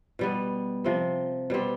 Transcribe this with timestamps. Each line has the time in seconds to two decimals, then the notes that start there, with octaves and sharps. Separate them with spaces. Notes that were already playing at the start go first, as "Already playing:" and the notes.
0.19 B2 G3 B3
0.84 C3 F3 C4
1.50 B2 G3 C4 G4